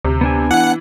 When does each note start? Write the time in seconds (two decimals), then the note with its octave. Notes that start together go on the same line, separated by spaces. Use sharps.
0.05 D2 C3
0.21 B3 D4 G#5
0.51 E3 F#5